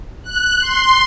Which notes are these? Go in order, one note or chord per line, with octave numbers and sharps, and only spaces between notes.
F#6
C6